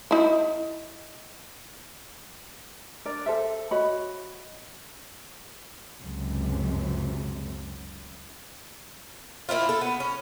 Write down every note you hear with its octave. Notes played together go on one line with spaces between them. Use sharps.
D#4 E4
D4 A#4 D5
A4 C5 E5
F#4 C#5 D#5 B5
C#2 F#2 C3
A#3 C4 E4 F4
A4
B3
C#4